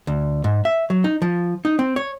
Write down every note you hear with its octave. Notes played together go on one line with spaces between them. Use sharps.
D2
G#2
E5
F#3
D#4
F3
D#4
C4
C#5